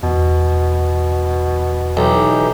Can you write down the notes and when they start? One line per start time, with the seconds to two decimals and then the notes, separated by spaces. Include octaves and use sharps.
0.03 E2 B2
1.97 B1 E3 D#4 G4